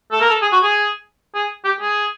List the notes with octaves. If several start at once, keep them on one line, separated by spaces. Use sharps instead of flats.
A4
A#4
A4
G#4
F#4
G#4
G#4
G4
G#4